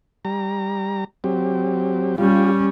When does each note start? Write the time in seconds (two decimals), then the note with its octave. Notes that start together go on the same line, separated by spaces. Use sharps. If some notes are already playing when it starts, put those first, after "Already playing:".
0.25 G3 A#5
1.24 F#3 C4 G4
2.18 G3 C#4 F4 G4